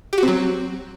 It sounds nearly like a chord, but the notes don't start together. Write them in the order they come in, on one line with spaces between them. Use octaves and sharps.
G4 F#4 C4 F#3